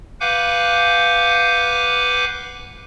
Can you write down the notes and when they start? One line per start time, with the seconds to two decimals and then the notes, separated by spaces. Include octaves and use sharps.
0.21 B4 F5 F#5 G#5 D6 G6